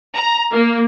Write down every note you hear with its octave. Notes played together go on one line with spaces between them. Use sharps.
A#5
A#3